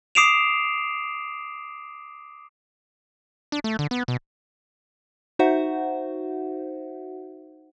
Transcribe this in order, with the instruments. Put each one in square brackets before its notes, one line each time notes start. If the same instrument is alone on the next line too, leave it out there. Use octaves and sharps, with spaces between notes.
[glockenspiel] D6 D#6 C7 D7 E7 F7
[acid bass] D4
A3
D3
B3
B2
[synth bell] D#4 F#4 C5 E5 F#5